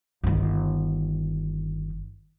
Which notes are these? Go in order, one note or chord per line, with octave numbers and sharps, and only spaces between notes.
G1 D#3